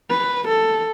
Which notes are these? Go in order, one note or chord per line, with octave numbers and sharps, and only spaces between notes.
B4
A4